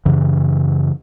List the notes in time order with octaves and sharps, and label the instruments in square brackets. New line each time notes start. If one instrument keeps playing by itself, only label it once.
[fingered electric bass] F#2 C#3 E3